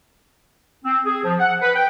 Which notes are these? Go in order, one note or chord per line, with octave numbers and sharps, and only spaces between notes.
C4
G#4
F3
F#5
B4
G5